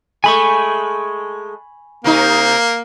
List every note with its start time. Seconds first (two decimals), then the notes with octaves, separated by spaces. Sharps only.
0.24 G#3 A3 G#5 B5 C#6
2.04 C3 A#3 D#4